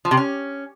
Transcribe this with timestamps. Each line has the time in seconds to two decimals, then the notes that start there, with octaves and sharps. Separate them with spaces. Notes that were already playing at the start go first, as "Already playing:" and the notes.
0.05 F3
0.11 C3
0.17 C#4